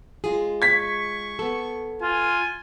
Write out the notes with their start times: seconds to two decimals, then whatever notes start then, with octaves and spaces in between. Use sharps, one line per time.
0.24 G#3 F4 G#4
0.62 C#6 G#6 B6
1.39 B3 A4
2.02 F4 G#5